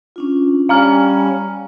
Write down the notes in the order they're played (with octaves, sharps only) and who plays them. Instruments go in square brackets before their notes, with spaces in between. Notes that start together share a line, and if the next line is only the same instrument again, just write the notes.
[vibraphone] C#4 D4 F4
[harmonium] G3 C#4 [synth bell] F5 A#5 F6 [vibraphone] G#5